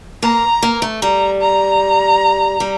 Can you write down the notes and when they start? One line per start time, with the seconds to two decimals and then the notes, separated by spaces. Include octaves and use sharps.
0.22 A#3 A#5
0.62 A#3
0.82 A3
1.02 G3 A#5
1.41 A#5
2.60 G3